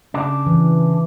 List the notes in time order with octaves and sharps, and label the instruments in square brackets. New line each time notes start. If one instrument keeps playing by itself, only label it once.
[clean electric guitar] C#3 D4
[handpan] E3